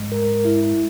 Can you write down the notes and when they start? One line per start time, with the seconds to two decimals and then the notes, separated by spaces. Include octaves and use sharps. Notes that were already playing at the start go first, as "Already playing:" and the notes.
Already playing: G#2 G#3
0.12 A#4
0.45 E4